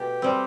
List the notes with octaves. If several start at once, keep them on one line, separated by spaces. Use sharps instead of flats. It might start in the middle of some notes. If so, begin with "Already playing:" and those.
Already playing: B2 A3 G4
G3 C4